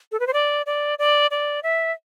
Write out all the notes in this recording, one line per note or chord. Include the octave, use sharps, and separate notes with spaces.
A4
B4
C5
D5
D5
D5
D5
E5